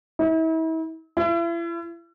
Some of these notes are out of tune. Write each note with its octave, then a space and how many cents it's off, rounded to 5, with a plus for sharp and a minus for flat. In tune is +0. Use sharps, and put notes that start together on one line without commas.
E4 -40
E4 +40